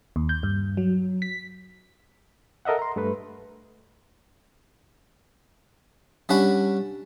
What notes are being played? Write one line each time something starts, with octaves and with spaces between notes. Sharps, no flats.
D#2
G6
G2
F#3
B6
A4 A#4 D#5 E5 F#5
A#5 C6
G2 A3 A4 B4
G3 C#4 D4 F#5 B5